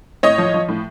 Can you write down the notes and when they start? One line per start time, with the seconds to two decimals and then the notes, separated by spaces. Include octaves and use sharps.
0.23 A2 C#5 D#5
0.38 F3
0.54 F3
0.69 A2